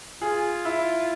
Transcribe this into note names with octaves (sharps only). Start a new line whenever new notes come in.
F4 G#4
E4